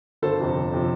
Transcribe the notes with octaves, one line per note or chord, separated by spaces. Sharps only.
G1 A4 C5
F2 C3 F3
G1
C3 F3